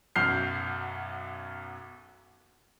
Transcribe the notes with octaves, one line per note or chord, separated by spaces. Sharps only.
B1 F#2 F6 G6 C7